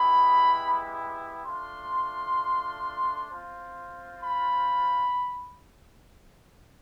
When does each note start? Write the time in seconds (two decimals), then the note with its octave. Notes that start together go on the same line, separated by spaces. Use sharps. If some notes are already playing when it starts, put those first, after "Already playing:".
Already playing: G#3 B3 E4 G4 B5
1.45 A3 D4 F4 C6
3.30 C4 F4
4.22 B5